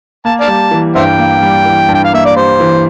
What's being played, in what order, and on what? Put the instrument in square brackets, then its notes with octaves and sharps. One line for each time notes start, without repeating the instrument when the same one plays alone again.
[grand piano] A#3 [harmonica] A5
[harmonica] D5 F5 A5
[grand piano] G3
E3
[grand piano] G2 [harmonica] C5 E5 G5
[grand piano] A#3
G3
E3
G2
[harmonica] G5
F5
[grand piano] A#3 [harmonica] E5
[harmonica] D5
[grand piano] G3 [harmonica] C5
[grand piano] E3